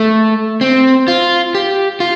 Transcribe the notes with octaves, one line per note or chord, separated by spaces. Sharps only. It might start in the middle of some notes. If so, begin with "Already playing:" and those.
Already playing: A3
C4
F4
G4
F4